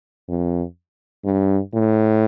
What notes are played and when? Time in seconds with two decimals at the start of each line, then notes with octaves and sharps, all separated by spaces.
0.29 F2
1.25 G2
1.74 A2